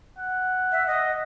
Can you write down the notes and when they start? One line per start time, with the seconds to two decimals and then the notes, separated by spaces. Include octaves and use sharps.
0.18 F#5
0.72 E5
0.87 D#5